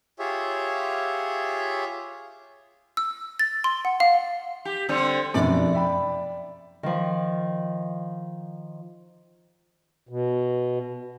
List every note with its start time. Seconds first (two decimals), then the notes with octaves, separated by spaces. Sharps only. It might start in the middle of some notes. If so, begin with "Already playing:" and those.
0.19 F4 G4 G#4 C#5 E5
2.97 E6
3.39 A6
3.64 C6
3.85 F#5
4.00 F5
4.65 G4
4.89 D3 G3 C4
5.34 F1 B1 F#2 D5
5.74 E5 G5 B5
6.83 D#3 F3
10.09 B2